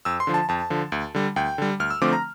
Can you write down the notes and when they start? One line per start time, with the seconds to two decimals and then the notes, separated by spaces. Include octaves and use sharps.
0.05 F2 E6
0.20 C6
0.27 D3 F3
0.34 A5
0.49 F2 A5
0.70 D3 F3
0.92 D2
1.15 D3 G3
1.36 D2 G5
1.58 D3 G3
1.80 D2 F6
1.90 E6
2.01 D3 F3 A3 C4 D6
2.13 A#5